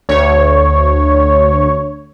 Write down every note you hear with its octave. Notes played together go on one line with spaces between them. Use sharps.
D2 C#5